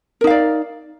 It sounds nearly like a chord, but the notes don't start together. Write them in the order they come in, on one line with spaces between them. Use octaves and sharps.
A#4 D#4 F5 D5